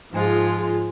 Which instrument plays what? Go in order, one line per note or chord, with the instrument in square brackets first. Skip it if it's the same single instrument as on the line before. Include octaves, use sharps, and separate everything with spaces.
[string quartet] G#2 G#3 F4 [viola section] F3 G#4